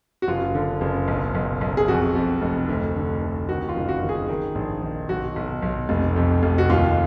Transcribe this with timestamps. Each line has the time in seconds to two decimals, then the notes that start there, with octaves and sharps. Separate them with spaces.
0.22 F#4
0.28 F#1 F4
0.55 D3
0.81 F#1
1.08 B1
1.35 B1
1.61 B1
1.77 G#4
1.88 F2 F#4
2.15 F2
2.42 F1
2.69 D2
2.95 D3
3.22 D2
3.48 D#3 F#4
3.69 F4
3.75 F#1
3.88 F#4
4.02 D#3
4.09 G#4
4.29 D#3
4.55 A#1
4.83 D#3
5.09 B1 F#4
5.36 B1
5.62 B1
5.89 F1
6.16 F2
6.43 F1
6.58 F#4
6.70 D#2 F4